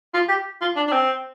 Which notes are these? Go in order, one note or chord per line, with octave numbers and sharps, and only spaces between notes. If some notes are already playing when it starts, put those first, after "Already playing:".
F4
G4
F4
D4
D4
C4